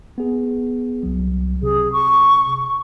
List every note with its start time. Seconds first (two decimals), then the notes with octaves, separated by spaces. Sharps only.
0.18 B3 G#4
1.03 C2 F#3
1.63 C3 G#4
1.93 C#6